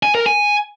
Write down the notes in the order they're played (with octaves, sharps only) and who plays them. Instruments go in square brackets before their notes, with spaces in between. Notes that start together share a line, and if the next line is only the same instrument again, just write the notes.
[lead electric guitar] G#5
A#4
G#5